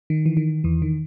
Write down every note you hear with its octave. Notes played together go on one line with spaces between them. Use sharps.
D#3
E3
D#3
E2 E3
D#3